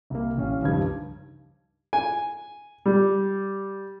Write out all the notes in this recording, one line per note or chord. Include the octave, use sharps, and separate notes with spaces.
C2 A#3
A1 C#4 F5
C#2 G2 D#3 F3 G3 G#6
G#5
G3